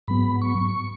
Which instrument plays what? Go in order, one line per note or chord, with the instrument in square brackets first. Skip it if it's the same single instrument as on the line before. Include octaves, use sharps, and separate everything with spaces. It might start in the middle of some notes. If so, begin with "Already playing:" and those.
[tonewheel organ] G#2 F#3 B3 B5
C#6